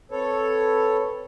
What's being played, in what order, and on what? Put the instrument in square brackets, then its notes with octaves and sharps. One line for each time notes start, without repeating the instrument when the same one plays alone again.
[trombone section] C4 B4 [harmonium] A4 C#5